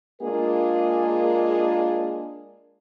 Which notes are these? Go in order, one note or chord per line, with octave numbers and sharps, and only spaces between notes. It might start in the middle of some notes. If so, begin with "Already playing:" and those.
G#3 A#3 D4 F4 G#4 A#4